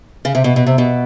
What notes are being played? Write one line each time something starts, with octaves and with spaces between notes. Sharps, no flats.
C#3
C3
B2
B2
C3
B2